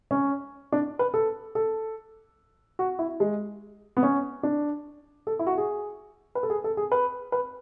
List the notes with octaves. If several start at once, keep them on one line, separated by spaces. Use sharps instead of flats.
C#4
D4
B4
A4
A4
F#4
E4
G#3
B3
C#4
D4
A4
E4
F#4
G#4
B4
A4
G#4
A4
G#4
B4
B4